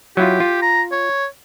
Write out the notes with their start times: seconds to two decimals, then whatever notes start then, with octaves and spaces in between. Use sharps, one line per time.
0.17 F#3 E4 F4 G4
0.40 F4
0.62 A#5
0.92 C#5